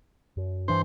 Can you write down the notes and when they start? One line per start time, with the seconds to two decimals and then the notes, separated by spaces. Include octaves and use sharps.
0.37 F#2
0.68 G2 E3 D4 C5